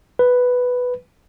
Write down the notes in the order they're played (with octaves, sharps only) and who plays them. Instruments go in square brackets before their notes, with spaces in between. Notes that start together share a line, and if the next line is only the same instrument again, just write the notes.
[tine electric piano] B4